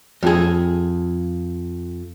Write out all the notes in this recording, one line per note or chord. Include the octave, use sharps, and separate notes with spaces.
F2 G#4